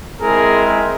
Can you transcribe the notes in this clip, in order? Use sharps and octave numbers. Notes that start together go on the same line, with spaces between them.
G#3 C4 E4 G#4 A#4